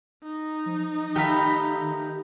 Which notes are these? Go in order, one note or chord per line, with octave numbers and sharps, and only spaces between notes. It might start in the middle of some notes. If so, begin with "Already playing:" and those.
D#4
F3
D#3 A3 G4 F5 A#5 B5